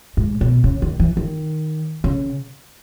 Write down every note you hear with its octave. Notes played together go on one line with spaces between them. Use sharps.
G#2
B2
C#3
D#3
E3
D#3
C#3